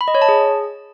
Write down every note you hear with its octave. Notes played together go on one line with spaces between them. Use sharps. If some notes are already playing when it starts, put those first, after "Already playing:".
B5
D#5
C#5
A5
G#4